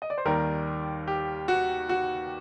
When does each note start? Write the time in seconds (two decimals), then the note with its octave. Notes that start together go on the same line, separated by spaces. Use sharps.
0.02 D#5
0.10 D5
0.18 C5
0.25 D#2 D#3 G3 A#4
1.07 G4
1.48 F#4
1.89 F#4